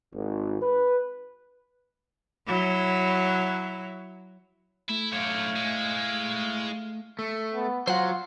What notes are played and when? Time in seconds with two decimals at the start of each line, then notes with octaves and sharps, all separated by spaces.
0.14 G#1
0.62 B4
2.47 F#3 E4
4.89 A3 E4
5.13 F#2 D3 E4 C#5 F5
5.56 G#3
7.19 A3
7.54 B3
7.87 F#3 F4 C5 F#5